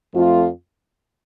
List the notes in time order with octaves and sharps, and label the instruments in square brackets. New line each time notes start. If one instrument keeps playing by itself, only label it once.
[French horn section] F2 F3 A3 F4